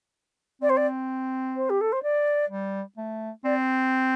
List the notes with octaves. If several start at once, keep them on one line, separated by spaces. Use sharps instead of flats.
C4 D5
C5
D5
C5
G4
A4
C5
D5
G3
A3
C4 D5